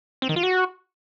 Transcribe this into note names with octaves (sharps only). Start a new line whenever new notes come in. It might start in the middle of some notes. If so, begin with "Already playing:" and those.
C4
D#3
F4
F#4